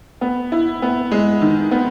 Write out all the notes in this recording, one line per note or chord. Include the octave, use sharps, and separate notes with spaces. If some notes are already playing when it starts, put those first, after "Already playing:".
B3
E4
B3
G#3
D#3
B3